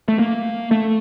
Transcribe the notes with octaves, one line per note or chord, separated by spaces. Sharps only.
A3
A#3
A3